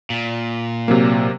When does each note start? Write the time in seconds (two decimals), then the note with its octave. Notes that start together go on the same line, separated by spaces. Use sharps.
0.10 A#2
0.88 C3 F#3 A#3